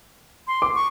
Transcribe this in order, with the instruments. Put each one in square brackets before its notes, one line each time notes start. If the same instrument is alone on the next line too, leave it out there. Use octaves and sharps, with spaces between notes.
[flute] C6
[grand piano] D6
[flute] C#6